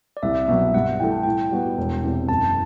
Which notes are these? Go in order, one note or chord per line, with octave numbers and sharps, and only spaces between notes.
D5
C2 E5
B2 F#3 E5
G2 F#5
E3 A3 G5
A5
A2 G5
G3 B3 F#4
E1
E2 C3
F#1 A5